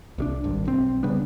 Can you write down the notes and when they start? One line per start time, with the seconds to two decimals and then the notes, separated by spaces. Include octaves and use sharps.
0.18 C2 G3 D4
0.44 G#1 G2
0.67 B1 C4
1.03 C#3 G3 B3 D4